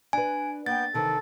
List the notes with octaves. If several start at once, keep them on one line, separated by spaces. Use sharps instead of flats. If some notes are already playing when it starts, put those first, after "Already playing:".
D4 B4 G#5
A#3 B3 G5 G6 A6
C3 D#3 E3 A4